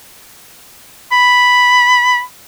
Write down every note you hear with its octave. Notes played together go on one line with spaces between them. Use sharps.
B5